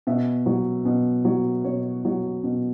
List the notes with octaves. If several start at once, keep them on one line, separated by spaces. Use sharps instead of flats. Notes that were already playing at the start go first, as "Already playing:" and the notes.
B2 E5
F#3
B2
F#3
B2 C#5
F#3
B2